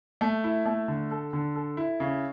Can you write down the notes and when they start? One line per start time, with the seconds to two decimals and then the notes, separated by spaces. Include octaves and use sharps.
0.21 A3
0.44 E4
0.66 A3
0.88 D3
1.11 A4
1.33 D3
1.56 A4
1.77 E4
2.00 C#3